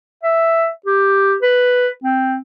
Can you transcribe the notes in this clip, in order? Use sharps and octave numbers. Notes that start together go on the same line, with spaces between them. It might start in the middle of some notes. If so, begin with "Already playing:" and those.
E5
G4
B4
C4